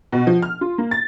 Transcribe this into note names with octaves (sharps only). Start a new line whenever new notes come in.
B2
F3
F6
F4
A#3
A6